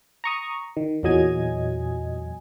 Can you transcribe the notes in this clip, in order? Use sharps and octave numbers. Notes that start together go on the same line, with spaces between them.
A#5 C#6 D#6
D#3
E2 A#2 F#3 D#5 G#5 G#6